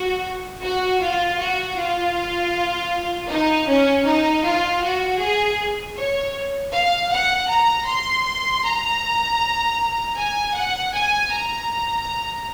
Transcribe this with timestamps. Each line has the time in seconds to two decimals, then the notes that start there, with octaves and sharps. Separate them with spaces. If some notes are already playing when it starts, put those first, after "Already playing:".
Already playing: F#4
0.62 F#4
1.00 F4
1.39 F#4
1.76 F4
3.29 D#4
3.68 C#4
4.05 D#4
4.44 F4
4.82 F#4
5.21 G#4
5.98 C#5
6.74 F5
7.12 F#5
7.50 A#5
7.88 C6
8.65 A#5
10.17 G#5
10.55 F#5
10.94 G#5
11.32 A#5